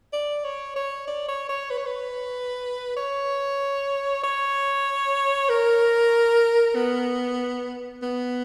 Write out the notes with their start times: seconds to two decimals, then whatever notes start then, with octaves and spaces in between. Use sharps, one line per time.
0.13 D5
0.44 C#5
0.76 C#5
1.08 D5
1.28 C#5
1.49 C#5
1.70 B4
1.78 C#5
1.86 B4
2.97 C#5
4.24 C#5
5.49 A#4
6.75 B3
8.02 B3